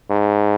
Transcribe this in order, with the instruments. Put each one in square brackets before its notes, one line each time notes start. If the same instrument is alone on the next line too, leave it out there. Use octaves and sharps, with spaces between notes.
[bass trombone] G#2